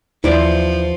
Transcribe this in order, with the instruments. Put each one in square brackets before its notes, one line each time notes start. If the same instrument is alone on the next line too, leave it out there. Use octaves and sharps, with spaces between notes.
[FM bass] D#2 [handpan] E3 B4 C5 [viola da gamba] F3 [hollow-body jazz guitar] E4 D5